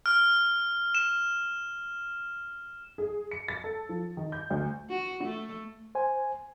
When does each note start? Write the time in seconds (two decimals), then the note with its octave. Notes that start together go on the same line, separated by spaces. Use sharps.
0.06 F6
0.95 E7
2.98 G#4
3.31 C#7
3.48 A6
3.64 A4
3.89 F3
4.17 D#3
4.32 G6
4.50 D2
4.90 F#4
5.24 A3
5.95 C5 G#5